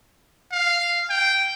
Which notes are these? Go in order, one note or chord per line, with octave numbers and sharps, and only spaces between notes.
F5
G5